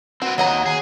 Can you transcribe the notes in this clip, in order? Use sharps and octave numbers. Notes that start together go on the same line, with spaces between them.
C4 F#4 B4
D#2 F#3 D#5 F#5 A#5
G#4